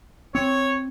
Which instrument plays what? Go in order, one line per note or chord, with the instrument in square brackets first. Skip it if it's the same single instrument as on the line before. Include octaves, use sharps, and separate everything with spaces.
[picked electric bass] C4 [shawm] C#5